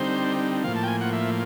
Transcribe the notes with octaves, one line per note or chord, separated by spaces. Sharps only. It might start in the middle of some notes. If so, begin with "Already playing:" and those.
Already playing: D3 G3 C4 D#4 C5
A2 F3 A#3 F5
A5
G5
G#5
F#5
E5